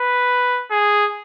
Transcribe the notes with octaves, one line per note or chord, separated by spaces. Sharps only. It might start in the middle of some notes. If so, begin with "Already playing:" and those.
Already playing: B4
G#4